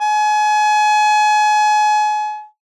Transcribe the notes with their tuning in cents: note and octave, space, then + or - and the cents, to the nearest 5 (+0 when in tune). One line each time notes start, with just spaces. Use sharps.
G#5 +35